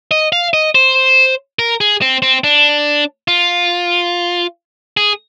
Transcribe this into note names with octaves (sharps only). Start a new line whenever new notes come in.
D#5
F5
D#5
C5
A#4
G#4
C4
C4
D4
F4
G#4